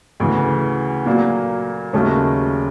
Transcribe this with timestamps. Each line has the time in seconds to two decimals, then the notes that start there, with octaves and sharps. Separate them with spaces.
0.20 D2 C#3 E3
1.06 A#2 F#3 A#3
1.93 D#2 C#3 F#3 A3 C#4